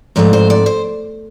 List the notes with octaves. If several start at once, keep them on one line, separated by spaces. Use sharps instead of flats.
G#2 F3 A3 C4 D5
C5
D5
C5